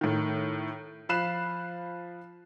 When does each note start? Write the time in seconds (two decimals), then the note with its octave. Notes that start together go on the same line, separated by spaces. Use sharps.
0.01 A2 D#3
1.09 F3 F5 B5 F#6 C7 E7